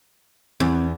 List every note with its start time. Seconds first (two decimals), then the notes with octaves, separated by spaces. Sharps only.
0.60 E2 C4